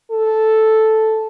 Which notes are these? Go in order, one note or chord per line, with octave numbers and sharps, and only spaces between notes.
A4